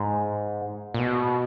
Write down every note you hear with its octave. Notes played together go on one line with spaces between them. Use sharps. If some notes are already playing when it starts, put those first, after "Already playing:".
Already playing: G#2
A#2
B2